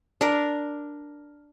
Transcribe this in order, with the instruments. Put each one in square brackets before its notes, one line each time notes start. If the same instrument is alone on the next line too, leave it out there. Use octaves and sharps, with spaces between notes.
[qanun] D4 A#4